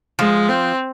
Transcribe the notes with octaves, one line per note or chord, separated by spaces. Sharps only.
F3 G#3
C4